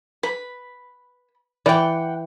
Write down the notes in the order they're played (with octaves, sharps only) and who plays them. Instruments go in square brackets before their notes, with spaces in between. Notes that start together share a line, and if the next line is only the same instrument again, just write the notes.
[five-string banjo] B4 [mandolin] B5
[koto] E3 [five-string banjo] D5 [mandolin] F#5 G5